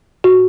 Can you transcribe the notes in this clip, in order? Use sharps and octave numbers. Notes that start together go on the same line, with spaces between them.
A#2 F#4